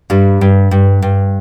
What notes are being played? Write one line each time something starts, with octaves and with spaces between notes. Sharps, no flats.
G2 G3
G2
G2
G2